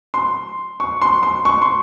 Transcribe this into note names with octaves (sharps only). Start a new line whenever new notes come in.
C6
C#6
C6
C6
C#6
C6